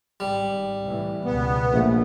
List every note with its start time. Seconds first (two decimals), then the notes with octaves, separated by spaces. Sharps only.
0.20 G#1 G3
0.83 C2 A2 E3
1.25 C#2 B2 B3
1.71 A#1 G#3 A3